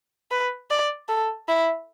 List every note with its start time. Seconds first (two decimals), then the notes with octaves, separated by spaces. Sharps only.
0.31 B4
0.70 D5
1.09 A4
1.48 E4